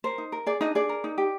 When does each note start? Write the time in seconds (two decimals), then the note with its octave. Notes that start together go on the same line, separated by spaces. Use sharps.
0.04 A#4 C5
0.18 D#4
0.32 A#4
0.46 G#4 D5
0.61 D4 D#4 D#5
0.75 G#4 D5
0.89 A#4
1.04 D#4
1.18 G4